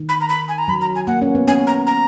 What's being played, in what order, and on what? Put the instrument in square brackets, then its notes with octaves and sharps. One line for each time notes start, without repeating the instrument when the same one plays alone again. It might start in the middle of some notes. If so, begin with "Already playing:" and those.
Already playing: [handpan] D#3
[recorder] B5
A#5
B5
G#5
A#5
[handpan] F#3 [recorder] B5
[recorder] A#5
G#5
[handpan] A#3 [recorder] F#5
[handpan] C#4
B3
[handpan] C#4 [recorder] G#5
[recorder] A#5
A#5